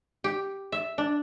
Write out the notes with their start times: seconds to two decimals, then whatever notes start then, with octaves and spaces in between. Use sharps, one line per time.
0.24 G4
0.72 E5
0.98 D4